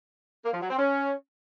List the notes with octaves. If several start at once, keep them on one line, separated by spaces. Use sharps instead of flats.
A#3
F3
F#3
C4
C#4